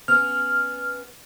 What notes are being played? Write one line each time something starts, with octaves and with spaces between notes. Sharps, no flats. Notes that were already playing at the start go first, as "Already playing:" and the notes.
B3 C#4 F6